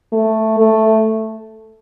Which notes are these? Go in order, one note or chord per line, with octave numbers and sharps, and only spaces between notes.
A3
A3